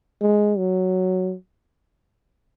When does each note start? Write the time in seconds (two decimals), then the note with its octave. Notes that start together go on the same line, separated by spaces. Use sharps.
0.21 G#3
0.58 F#3